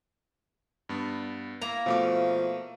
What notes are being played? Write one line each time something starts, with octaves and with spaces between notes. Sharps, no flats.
G2 B3
A#3 E4 A#5
B2 F3 A3 D6